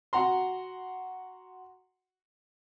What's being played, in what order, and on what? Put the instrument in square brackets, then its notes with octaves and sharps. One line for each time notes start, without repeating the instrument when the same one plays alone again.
[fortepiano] F#4 F#5 A#5 C6